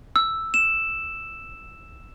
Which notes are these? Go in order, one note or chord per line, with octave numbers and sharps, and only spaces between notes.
E6
E7